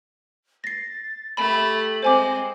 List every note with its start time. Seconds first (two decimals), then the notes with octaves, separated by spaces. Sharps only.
0.64 A6 A#6 C7
1.37 A3 G4 B5 F#7
2.03 G#3 C4 C5 G#5 D6